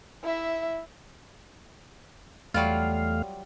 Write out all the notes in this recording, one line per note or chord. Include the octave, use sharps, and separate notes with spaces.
E4 E5
E2 F#3 G3 A3 F4 F5